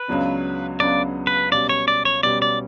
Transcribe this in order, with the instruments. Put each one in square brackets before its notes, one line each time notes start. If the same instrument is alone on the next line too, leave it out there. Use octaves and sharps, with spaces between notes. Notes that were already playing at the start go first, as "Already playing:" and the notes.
Already playing: [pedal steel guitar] B4
[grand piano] C#2 C#3 F#3 B3 D4
[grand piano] C#2 C#3 F#3 B3 D4 [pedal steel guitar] D5
[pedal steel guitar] B4
[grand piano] B2 G3 C#4 [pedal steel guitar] D5
[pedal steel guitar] C#5
D5
C#5
[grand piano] B2 G3 C#4 [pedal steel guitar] D5
[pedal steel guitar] D5